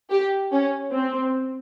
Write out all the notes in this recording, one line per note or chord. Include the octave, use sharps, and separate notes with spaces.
G4
C#4
C4